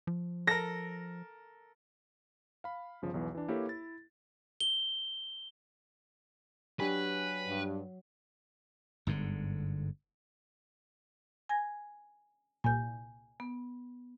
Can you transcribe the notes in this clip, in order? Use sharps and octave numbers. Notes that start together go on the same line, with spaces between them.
F3
A4 A#4 A#6
F5 B5
G1 C#3 F3
B1 E2 E3
E3 D4
A#3 E4 G4 A4 B4 C#5
E4 A6
G7
F#3 D4 G4 B4 G#5
G2
G1 G#2 D3
G#5 G#6 A#6
C2 A#2 G#5 G6
B3